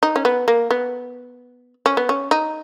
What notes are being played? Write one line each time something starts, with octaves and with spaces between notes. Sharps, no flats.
D#4
C#4
B3
A#3
B3
C#4
B3
C#4
D#4